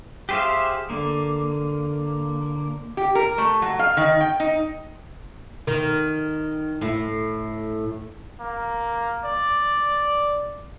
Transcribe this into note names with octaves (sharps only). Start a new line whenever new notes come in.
G4 G#4 C5 E5 F5
D3 A#3
G4
A#4
A3
F#3
F5
D#3
G5
D#4
D#3
A2
A#3
D5